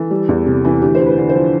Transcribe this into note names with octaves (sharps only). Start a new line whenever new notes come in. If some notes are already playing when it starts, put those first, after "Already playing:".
Already playing: E3 A4
G3
E2
C3
E3
D2 G4
C5
D2
B4
D3
C5
F3